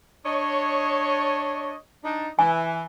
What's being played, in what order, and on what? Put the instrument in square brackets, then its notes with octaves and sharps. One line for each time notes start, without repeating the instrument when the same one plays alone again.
[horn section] D4 C#5 D#5
D4 D#4
[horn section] E3 [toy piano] G#5